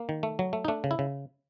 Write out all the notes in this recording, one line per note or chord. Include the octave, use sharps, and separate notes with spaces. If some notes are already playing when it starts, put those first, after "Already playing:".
Already playing: A#3
D#3
A3
F#3
A3
D#4
A3 D4
C#3
E4
C#3